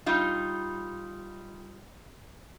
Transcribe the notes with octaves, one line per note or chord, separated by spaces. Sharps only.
G3 D#4 F4